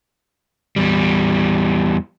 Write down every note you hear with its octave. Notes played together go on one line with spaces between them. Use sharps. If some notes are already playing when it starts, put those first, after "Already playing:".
E2 G3